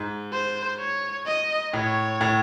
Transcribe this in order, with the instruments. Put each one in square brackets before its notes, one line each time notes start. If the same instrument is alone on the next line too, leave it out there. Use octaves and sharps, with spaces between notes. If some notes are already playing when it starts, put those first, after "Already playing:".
Already playing: [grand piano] G#2
[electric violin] C5
C#5
D#5
[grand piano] A2 [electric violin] C#5
[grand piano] A2